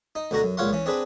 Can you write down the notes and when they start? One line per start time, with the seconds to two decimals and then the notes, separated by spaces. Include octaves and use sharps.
0.15 D#4
0.31 D2 B2 D3 F#4 A#5
0.43 F#2
0.57 C#2 A#2 C#5 F5 F#5 C6
0.73 E3 C#4
0.86 C4 D4 G#4 B4